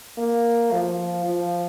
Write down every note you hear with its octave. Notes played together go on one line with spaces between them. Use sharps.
A#3
F3
F3